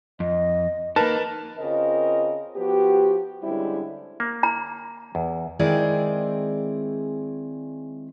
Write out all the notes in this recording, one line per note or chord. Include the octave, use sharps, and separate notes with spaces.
F2 D#5
A#3 D#4 A#4 B4 A5
C#3 C4 F4 A#4 D#5
F3 B3 F#4 G4
D3 G3 G#3 C4 C#4 E4
A#3
A#5
E2
D#3 G#3 C4 E4 G#4 D5